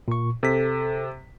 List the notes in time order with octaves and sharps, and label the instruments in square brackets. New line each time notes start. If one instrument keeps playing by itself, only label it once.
[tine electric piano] A#2 C#6
[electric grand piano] C3 B6 [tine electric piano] A4